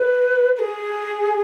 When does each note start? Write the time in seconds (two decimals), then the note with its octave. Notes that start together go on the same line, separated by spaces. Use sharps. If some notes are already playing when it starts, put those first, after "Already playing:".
Already playing: B4
0.56 B4
0.59 G#4